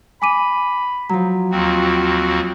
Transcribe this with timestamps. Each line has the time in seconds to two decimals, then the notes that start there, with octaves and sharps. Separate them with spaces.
0.22 G#5 B5 D6 D#7
1.10 F3 F#3 A#5
1.51 D#2 C4 F4 F#4